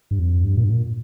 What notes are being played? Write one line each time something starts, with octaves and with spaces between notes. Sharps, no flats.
G2
F2
G2
A#2
G2
A#2